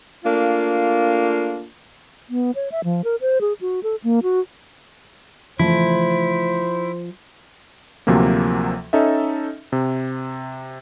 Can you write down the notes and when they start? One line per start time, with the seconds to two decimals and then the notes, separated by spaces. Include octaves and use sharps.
0.24 A3 A#3 D4 F4
2.30 B3
2.55 C#5
2.72 E5
2.84 F3
3.04 A#4
3.21 C5
3.41 G#4
3.61 F#4
3.83 A4
4.04 A#3
4.23 F#4
5.59 C#3 E3 F3 A3 E4 C5
8.07 D2 C3 F3 F#3 A#3
8.93 C#4 D#4 A4 D#5 E5
9.72 C3